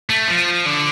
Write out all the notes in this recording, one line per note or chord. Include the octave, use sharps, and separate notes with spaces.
A3
F3
D3